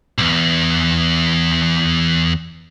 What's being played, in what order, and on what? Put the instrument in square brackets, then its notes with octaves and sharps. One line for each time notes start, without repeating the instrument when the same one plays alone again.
[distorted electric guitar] B1 E2